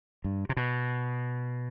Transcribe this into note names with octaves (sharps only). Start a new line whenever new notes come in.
G2
C3
B2